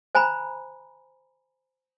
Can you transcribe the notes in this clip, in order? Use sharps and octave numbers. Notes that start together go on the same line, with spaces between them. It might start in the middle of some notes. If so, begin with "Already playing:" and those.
C5 G#5 A#5 B5